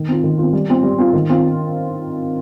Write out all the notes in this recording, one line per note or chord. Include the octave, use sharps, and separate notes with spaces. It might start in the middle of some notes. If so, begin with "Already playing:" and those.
Already playing: D#3
C4 F4
D#3
C4 F4
G3
C4 F4
G3
C4 F4
D#3
C4 F4